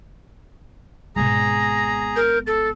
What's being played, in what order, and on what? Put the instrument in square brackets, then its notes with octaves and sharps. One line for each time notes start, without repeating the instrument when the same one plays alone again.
[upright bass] G#1 B2 [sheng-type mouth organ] G#4 A#5 [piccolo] A#6
[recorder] A#4 [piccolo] G6
[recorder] A4 [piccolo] A6